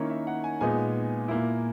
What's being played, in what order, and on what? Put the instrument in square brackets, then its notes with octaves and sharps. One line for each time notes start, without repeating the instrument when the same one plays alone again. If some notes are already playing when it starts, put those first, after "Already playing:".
Already playing: [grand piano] D#3 A#3 C#4 E4 C#5
E5
F#5
G#5
A#2 G#3 B3 D#4 G#5
A#2 A#3 E4